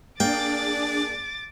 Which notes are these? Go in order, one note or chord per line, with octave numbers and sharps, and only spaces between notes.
A#3 D4 G#4 D5 G5 D6 A6